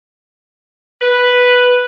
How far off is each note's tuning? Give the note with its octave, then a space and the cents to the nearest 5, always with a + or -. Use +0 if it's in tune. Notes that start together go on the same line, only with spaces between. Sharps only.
B4 +0